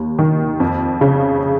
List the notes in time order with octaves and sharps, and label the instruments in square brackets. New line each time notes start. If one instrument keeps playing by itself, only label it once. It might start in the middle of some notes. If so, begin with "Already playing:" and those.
Already playing: [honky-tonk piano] D#2
D#3
F2
C#3